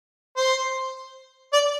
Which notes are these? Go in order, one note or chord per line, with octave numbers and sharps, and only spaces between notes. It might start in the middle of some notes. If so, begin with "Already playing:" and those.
C5
D5